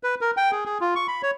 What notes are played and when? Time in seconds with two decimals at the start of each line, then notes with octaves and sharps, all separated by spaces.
0.03 B4
0.21 A#4
0.37 G5
0.52 G#4
0.65 G#4
0.81 F4
0.96 C#6
1.08 B5
1.22 C#5